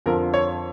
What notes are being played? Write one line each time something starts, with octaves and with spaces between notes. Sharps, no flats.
F2 D3 F3 A#4
C#5